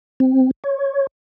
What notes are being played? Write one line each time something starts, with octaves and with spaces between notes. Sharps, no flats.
C4
C#5